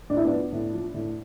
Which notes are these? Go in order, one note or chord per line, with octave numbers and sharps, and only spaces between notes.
A2 D4
E4
B3 D4
F3
A2
F3
A2